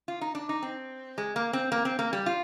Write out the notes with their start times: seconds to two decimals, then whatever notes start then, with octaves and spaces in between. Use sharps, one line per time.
0.08 F4
0.21 D#4
0.35 D4
0.49 D#4
0.62 C4
1.18 G#3
1.36 A#3
1.53 C4
1.72 A#3
1.85 C4
1.99 A#3
2.13 G3
2.26 F4